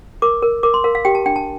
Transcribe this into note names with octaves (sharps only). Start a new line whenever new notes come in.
A#4 D6
A#4
A#4 D6
C6
A#4 F5
F5
G4 G5
A5
D4 G5
A5